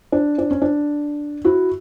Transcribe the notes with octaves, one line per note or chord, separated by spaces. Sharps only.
D4
D4
C#4
D4
E4 F#4